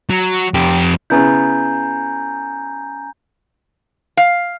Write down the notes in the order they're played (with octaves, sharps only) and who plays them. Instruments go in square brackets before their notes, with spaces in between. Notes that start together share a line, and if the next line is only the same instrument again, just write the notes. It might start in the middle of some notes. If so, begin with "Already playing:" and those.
[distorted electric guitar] F#3
F2 G4
[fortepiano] C#3 B3 E4 [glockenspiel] G#5 A#5 G6
[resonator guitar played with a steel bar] F5